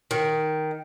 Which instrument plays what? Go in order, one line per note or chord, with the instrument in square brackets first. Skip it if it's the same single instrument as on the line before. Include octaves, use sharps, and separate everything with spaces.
[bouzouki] D#3